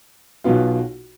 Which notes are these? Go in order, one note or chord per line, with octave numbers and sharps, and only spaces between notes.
B1 B2 B3 F4